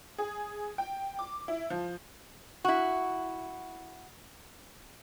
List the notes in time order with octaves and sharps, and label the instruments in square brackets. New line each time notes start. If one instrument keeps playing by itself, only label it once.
[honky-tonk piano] G#4
G5
D6
E4
F3
[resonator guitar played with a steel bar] E4 F#4